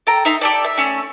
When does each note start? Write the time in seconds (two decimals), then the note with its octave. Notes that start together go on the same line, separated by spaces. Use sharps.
0.07 A4 G5 A#5
0.25 D#4 E5 A#5 C6
0.41 G4 A4 D5
0.65 E5
0.78 A3 C#4